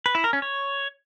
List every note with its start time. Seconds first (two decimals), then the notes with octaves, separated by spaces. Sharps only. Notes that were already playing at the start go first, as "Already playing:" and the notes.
0.06 B4
0.15 E4
0.24 A#4
0.33 C#4
0.42 C#5